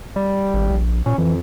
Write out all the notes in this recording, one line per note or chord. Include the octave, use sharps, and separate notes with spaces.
G3
G#1
A#1
A#2 C#4
F2 E3